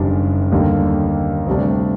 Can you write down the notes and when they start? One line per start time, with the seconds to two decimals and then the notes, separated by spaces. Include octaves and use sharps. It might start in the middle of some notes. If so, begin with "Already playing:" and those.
Already playing: F#1 F#2 D#3 G3 D4
0.52 D#2 D3 G3 A#3
1.46 D2 C3 G3 D4